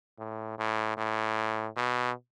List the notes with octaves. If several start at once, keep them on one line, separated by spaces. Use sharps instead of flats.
A2
A2
A2
B2